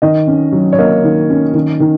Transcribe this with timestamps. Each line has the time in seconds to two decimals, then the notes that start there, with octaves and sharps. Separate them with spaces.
0.02 D#3 D#5
0.27 C#4
0.52 F#3
0.73 C#5
0.79 A#3 D#5
1.04 D#3
1.30 C#4
1.54 D#3
1.80 D#3